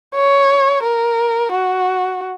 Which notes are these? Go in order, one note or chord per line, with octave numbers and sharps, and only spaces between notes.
C#5
A#4
F#4